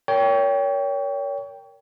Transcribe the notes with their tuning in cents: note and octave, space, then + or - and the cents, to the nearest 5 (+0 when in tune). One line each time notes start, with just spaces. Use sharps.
A#4 +0 C#5 +30 G5 +0